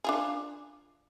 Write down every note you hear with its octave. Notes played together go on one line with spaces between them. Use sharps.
D4 F4 G#4